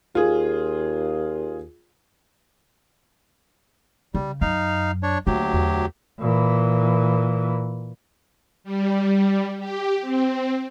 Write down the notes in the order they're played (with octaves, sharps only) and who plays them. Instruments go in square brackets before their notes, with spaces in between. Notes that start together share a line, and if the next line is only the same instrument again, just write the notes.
[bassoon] D#2 [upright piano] F4 G#4
[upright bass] C#3 [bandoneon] G3
[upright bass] F#2 [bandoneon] D#4 F5
[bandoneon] D4 C#5
[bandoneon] D2 F#3 G4 [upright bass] A#3
[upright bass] E2
[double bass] A#2 E3
[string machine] G3
G4
C4